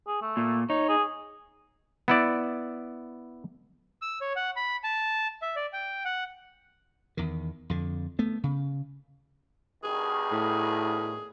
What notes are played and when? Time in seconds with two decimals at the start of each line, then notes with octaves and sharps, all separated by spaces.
0.07 G#4
0.22 A3
0.37 A#2
0.70 D#4 C#5
0.89 G#4
2.08 B3 E4 D5
4.02 E6
4.21 C#5
4.36 F#5
4.56 B5
4.84 A5
5.42 E5
5.56 D5
5.73 G5
6.05 F#5
7.17 E2 D#3
7.70 F2 D3
8.19 A3 B3
8.44 C#3
9.84 G2 B2 D#3 G#4
10.32 A2